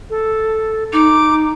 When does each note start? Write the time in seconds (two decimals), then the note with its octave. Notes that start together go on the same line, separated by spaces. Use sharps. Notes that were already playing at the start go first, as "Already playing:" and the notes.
0.10 A4
0.93 D#4 D6